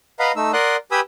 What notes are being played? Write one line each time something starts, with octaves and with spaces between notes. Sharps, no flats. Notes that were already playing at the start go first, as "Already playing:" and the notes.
B4 D#5 F5 F#5 A#5 B5
A3 D#4 E6
A#4 D5 F#5 C6 D#6 F#6
G4 B4 G#5 B5 D#6 E6